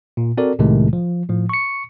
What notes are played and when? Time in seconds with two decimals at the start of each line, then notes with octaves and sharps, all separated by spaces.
0.17 A#2
0.37 C4 F#4 A4 A#4 D5
0.59 C2 A2 C3 D#3 G#3 A3
0.93 F3
1.29 A2 F3
1.49 C#6 C#7